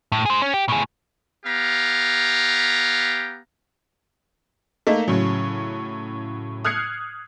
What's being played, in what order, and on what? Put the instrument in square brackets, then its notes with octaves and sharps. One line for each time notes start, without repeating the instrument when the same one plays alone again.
[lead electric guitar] A2
G#4 C5
C#4
G4
A2 G#4
[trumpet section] B3 G4 F5 A#5
[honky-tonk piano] A3 A#3 D#4
A2 C#3 F#3
D#6 F6 F#6 G#6 C7 C#7